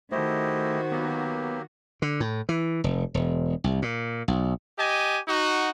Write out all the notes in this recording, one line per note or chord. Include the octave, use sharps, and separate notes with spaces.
D#3 A3 E4 F#4 G4 C5 D#5
F#3 A#3 B3 G4
D3
A2
E3
F1
E1
C2
A#2
B1
G4 D#5 G#5
D#4 F#4